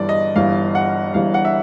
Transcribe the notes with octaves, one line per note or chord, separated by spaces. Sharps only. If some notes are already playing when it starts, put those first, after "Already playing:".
Already playing: G1 G2 E3 D5
D#5
G1 G2 E3 F5
F#5
G1 G2 E3 F5
F#5
E5